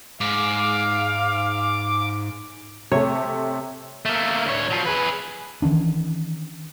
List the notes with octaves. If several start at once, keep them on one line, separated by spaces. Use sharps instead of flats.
G#2 F5 D6
C3 A3 C#5
A3 A#3
D2 C#5
F3 F#3
G#4 B4
D#3 E3 C#4 D4